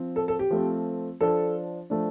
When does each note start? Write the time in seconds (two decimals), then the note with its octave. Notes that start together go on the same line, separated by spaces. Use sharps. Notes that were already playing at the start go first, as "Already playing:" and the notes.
Already playing: F3 C4
0.16 A4
0.28 A4
0.39 G4
0.50 F3 A3 C4
1.21 F3 D4 A4
1.90 F3 A3 D4